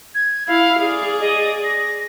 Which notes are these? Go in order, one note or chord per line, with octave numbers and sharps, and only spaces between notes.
G#6
E4 F5
G#4 D5 F5
D#5
A#6